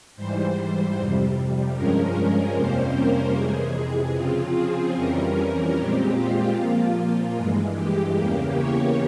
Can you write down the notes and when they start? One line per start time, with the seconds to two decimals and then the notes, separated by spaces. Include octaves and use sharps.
0.16 G#2 E3 G3 C5
0.96 F2 C3 G3
1.75 G2 F3 G#3 C#4 A#4
2.55 F2 C3 G3 A#3 C#4 C5
2.95 A#4
3.35 F2 C3 E3 G#3 G#4
4.15 C#3 F3 C4 F4
4.56 G#4
4.95 F2 E3 G3 C#4 A#4
5.74 A#2 G#3 C4 G4
6.14 F4
6.55 A#2 F3 A#3 F4
7.35 G2 E3 G#3
7.75 G4
8.14 E2 C#3 E3 A#3
8.54 C#5